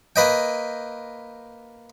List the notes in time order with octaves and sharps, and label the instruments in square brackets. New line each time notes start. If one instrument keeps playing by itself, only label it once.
[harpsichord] A#3 B4 D#5 G5